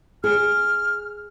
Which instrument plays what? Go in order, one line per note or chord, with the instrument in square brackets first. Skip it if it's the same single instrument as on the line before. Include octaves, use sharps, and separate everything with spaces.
[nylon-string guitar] G#4 [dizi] F6